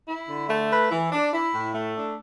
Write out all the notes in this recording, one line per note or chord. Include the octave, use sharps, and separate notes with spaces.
E4
D3
A3
B4
E3
D4
E4
A2
A3
D4